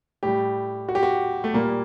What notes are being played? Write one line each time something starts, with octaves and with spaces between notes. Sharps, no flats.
A2 G3 G4
F#4
G4
F#4
A3
A#2 G3 A#3